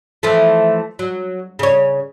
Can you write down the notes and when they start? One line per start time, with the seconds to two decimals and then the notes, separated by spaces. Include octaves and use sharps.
0.23 E3 F3 A3
0.99 F#3
1.59 C#3 C#5